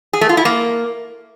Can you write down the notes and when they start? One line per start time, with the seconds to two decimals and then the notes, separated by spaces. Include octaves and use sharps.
0.13 G#4
0.21 A3
0.29 F4
0.37 E4
0.45 A#3